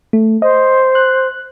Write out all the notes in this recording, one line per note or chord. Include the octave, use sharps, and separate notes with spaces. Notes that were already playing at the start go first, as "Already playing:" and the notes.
A3
C5 D#5
F#6